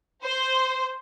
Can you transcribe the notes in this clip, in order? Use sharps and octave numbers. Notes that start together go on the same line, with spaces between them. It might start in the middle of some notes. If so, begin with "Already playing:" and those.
C5